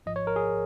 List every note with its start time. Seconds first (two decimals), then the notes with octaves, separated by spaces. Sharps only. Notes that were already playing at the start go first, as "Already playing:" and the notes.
0.06 G#1 G#2 F3 D#5
0.16 C#5
0.27 A#4
0.36 G#4